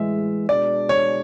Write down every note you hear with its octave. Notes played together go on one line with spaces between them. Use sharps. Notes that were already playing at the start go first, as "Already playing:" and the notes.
Already playing: A2 E3 G#3 E5
B2 G#3 D4 D5
C#5